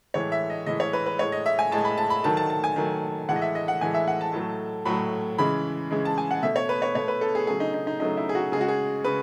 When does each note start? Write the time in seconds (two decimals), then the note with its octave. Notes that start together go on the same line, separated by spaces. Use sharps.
0.14 A2 E3 G#3 C#5
0.32 E5
0.50 D#5
0.66 A2 E3 G#3 D#5
0.80 C#5
0.93 B4
1.06 B4
1.19 A2 G#3 C#5
1.32 D#5
1.46 E5
1.59 G#5
1.71 A2 G#3 A5
1.85 B5
1.98 A5
2.10 B5
2.24 D#3 F#3 A3 A5
2.37 A5
2.50 A5
2.64 G#5
2.76 D#3 F#3 A3
3.28 A2 E3 G#3 F#5
3.36 D#5
3.42 E5
3.55 D#5
3.68 F#5
3.81 A2 E3 G#3 G#5
3.94 E5
4.08 F#5
4.21 A5
4.33 A2 F#3 A3
4.85 A2 F#3 A3 B5
5.38 C#3 E3 G#3 B5
5.91 C#3 E3 G#3
6.05 A5
6.18 G#5
6.31 F#5
6.43 B2 A3 E5
6.56 C#5
6.69 B4
6.82 C#5
6.95 B2 A3 C#5
7.08 B4
7.21 A4
7.35 G#4
7.47 C#3 F#3 A3 G#4
7.60 D#4
7.74 D#4
7.87 D#4
8.00 C#3 F#3 A3 D#4
8.17 E4
8.29 G#4
8.35 F#4
8.52 C#3 G#3 G#4
8.61 F#4
8.68 G#4
9.04 C#3 B4